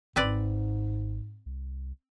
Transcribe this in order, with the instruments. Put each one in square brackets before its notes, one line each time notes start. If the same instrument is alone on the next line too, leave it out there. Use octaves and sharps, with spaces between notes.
[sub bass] G#1 [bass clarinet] G#2 [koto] C4 B4 D5
[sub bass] C2